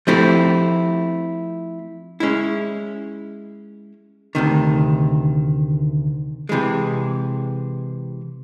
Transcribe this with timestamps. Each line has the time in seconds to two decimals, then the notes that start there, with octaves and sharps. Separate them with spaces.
0.07 F3 A3 C4 E4 G4
2.20 G#3 C#4 E4
4.35 D2 C3 D#3
6.49 C3 E3 G#3